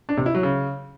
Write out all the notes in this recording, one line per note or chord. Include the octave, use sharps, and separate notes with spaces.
D4
C3
E4
F#3
C#3